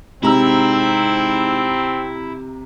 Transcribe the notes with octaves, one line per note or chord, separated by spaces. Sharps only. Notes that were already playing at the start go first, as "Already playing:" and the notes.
G#2 C3 C4 E4 A#5 E6